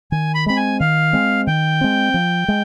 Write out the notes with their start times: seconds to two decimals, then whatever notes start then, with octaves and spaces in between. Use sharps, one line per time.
0.12 D#3 G#5
0.35 B5
0.46 G#3 C4 B5
0.57 G#5
0.80 D#3 F5
1.13 G#3 C4
1.47 D#3 G5
1.81 G#3 C4
2.14 F3
2.48 G#3